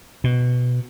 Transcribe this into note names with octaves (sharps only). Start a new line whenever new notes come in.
B2